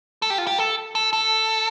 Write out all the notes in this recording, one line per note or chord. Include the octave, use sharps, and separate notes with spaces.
A4
G4
F4
G4
A4
A4
A4